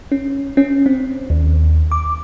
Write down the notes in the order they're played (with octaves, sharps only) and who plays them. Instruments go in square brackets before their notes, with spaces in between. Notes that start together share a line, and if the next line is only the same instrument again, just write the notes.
[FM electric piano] C#4
C#4
C4
D#2
D6